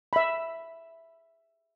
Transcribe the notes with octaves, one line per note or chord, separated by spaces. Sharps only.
E5 B5